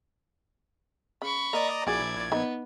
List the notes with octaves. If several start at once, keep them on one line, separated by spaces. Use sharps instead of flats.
C#3 B5 C#6
A#3 D5 D#5 A#5
A#1 E4 F#4 G#4 D5 G#6
B3 D#4 D5 B5